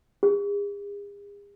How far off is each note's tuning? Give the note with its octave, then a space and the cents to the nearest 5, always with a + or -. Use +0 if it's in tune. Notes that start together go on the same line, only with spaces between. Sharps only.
G#4 -40